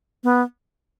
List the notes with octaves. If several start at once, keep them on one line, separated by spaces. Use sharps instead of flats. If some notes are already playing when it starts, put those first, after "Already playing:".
B3